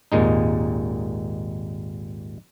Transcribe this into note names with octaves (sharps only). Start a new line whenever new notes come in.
G#1 D#2 A#2 G#3 D#4